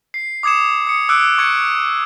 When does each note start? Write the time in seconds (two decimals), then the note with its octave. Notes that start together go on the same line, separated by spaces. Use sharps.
0.14 C7
0.43 D6 D#6 G#6 C#7 E7
0.87 D#6 C#7
1.09 D6 E6 F#6 D7
1.38 C#6 G#6 C#7 D7